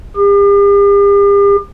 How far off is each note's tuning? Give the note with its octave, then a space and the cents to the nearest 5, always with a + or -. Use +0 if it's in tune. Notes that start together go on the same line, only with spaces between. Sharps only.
G4 +45